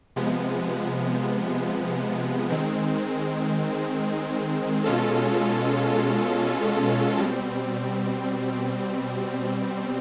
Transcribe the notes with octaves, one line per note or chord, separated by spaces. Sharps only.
C3 F3 G#3 B3
D#3 G#3 C4
B2 G#3 C#4 F4 A4
B2 G3 C4